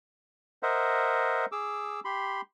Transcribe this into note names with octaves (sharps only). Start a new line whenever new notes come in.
A#4 C5 D#5 E5 F#5
G#4 D6 E6
G4 B5 C6